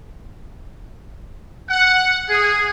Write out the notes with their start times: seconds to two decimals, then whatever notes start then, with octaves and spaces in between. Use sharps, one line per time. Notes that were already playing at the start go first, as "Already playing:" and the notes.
1.70 F#5
2.29 G#4